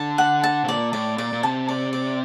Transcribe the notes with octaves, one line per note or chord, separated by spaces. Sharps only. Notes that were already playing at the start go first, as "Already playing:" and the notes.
Already playing: D3 A5
F#5
A5
C3
A#2 D5
A2 D5
A#2 D5
A#2
C3 A5
D5
D5